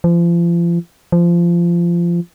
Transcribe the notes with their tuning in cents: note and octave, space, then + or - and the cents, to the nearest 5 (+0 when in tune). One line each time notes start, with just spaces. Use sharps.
F3 -35
F3 -20